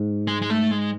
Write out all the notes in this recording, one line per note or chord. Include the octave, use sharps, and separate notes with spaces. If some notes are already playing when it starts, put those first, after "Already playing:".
Already playing: G#2
G#3
G#3
A3
G#3